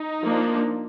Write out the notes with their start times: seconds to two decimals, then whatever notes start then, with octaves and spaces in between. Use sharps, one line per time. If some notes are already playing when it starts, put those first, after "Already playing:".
Already playing: D#4
0.24 F3 A#3 D4